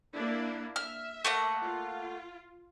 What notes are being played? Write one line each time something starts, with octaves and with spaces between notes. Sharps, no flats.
A#3 D4 E4
E5 F6
A3 A#3 F#5
F4